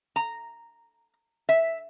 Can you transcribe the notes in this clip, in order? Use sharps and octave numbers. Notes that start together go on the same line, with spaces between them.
A#5
E5